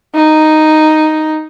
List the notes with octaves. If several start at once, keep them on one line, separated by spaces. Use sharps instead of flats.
D#4